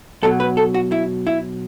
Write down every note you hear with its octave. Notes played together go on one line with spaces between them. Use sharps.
B1 B2 F#3 A4
B4
A4
F#4
E4
E4